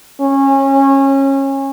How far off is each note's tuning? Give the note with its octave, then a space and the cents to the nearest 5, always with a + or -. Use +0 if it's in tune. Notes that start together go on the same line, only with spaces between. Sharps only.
C#4 -25